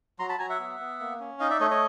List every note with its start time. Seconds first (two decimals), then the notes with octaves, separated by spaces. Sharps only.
0.19 F#3 A#5 C6
0.29 A5 B5
0.39 F#3 G#5 A#5
0.49 E5 F#5
0.60 B3
0.80 B3
1.00 A#3
1.20 C#4
1.40 D#4 D#5 F5
1.50 D5 E5
1.60 A3 C#5 D#5
1.71 C#5 D#5